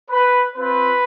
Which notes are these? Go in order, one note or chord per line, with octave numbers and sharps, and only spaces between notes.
B4
C4 F4 B4